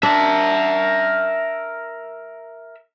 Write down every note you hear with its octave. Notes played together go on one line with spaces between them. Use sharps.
D4 A#4 E5